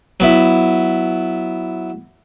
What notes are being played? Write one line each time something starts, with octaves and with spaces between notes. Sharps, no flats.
F#3 B3 E4